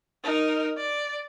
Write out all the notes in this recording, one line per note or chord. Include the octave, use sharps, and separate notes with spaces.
D#4 A#4
D5